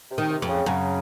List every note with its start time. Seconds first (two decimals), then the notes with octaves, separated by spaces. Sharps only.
0.11 C3
0.18 D#3
0.30 C3
0.42 F2
0.48 C#3
0.66 F#2 C#3